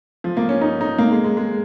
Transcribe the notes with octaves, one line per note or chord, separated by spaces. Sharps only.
F3
A#3
C#4
D#4
D#4
A#3
G#3
G#3
G#3